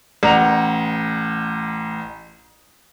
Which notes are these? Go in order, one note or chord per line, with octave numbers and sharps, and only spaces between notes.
A1 F#5 A#5 F7